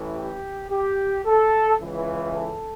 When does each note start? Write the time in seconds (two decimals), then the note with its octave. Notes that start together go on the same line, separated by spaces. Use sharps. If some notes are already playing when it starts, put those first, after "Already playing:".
Already playing: A1 A2 E3
0.16 G4
0.71 G4
1.25 A4
1.80 C#2 C#3 E3
2.34 A4